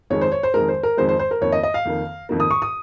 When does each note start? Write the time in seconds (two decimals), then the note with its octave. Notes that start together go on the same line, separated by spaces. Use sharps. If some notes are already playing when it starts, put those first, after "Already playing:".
0.10 F2 D#3 G#3 C#5
0.21 C5
0.32 C#5
0.43 C5
0.54 F2 D#3 G#3 A#4
0.68 C5
0.83 A#4
0.97 F2 D#3 G#3 C5
1.09 C5
1.19 C5
1.31 A#4
1.41 F2 D#3 A#3 C#5
1.52 D#5
1.63 D#5
1.74 F5
1.85 F2 D#3 A#3
2.29 F2 D#3 A#3
2.40 D#6
2.51 C#6
2.62 D#6